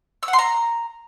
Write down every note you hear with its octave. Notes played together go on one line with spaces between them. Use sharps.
E6
F#5
C6
A#5